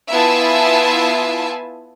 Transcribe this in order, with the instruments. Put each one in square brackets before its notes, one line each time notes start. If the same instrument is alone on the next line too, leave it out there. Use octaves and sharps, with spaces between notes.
[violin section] B3 E4 F4 E5 G#5 A5